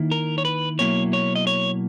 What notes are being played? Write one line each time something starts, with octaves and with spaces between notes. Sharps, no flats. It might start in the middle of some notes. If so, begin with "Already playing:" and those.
Already playing: D#3 A#3 E4
A#4
C#5
B4
B2 F#3 A#3 E4 C#5
C#5
D#5
C#5